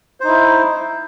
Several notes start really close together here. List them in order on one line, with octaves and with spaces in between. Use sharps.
C5 D#4 E4